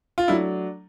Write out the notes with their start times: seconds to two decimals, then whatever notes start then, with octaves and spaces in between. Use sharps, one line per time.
0.18 F4
0.28 F#3 A3 D4 E4